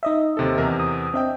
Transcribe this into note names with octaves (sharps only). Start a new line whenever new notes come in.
D#4 D#5 E5
D#2 C3 A4
E2 C3 A#4
D#6
C4 D4 D#5 E5 G5